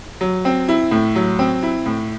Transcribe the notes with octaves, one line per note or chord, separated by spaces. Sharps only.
F#3
C4
E4
A2
F#3
C4
E4
A2